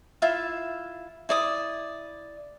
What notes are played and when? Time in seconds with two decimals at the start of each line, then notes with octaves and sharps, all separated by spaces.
0.22 E4 F4 E5 F5
1.29 E4 D5 D#6